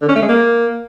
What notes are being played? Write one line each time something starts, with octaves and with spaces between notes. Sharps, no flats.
D3
C#4
A3
G#3
A#3